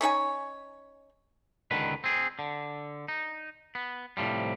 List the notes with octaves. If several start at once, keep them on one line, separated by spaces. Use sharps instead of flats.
C#4 D#4 C#5 G#5
C#2 D3 D#3 B4
C4 G#4
D3
D#4
B3
A2 C3 F3 G3